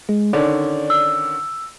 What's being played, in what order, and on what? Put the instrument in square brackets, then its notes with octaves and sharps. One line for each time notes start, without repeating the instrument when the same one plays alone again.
[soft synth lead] G#3
[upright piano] D3 D#3 C#4 [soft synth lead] D5
[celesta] E6